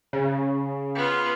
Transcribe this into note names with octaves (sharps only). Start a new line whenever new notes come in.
C#3
B3 F4